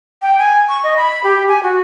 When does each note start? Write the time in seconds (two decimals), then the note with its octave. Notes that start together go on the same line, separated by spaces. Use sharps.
0.22 G5
0.39 G#5
0.69 C#6
0.84 D#5
0.97 B5
1.24 G4
1.48 G#5
1.63 F#4